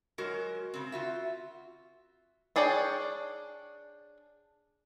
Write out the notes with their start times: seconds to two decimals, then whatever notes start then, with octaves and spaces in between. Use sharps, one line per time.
0.18 F#3 G#3 F#4 A#4
0.74 C#3 C4
0.92 F4 F#4 E5
2.56 D4 G#4 C#5 D5 G5